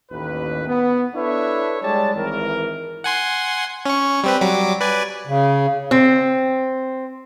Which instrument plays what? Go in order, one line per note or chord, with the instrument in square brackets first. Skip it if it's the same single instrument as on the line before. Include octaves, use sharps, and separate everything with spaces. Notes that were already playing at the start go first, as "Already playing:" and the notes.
[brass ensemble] A1 D#2 B4
B3
D4 E4 A4 B4 C#5 E5
G3 G#3 C#5 D5 A5
G#1 E3 A#4
[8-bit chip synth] F#5 G#5 C6
C#4 C#6
G3 C4 B4
F#3 G3 D6
B4 D5 G#5
[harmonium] C#3
[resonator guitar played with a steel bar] C4